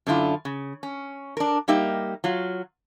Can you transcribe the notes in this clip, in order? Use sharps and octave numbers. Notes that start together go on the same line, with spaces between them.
F#2 D3 D4 E4 F4
C#3
C#4
D4 A#4
G3 A#3 D#4 G4 E5
F#3 F4